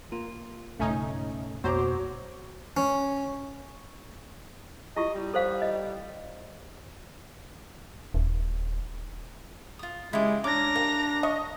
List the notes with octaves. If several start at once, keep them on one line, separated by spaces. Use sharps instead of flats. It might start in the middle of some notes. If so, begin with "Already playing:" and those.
A#3 F4
B1 G2 C#3 A3 C#4 D#4
B1 F2 B2 F#3 A#3 C5 A#5 D6
C#4
E4 F4 G4 D#5
G3
A4 C5 F5
D#5
D#1
F4 D#6
C#3 G#3 E4 G4
C#4 D4 A#5 D6 A#6
A#3 G4
D#5 C#6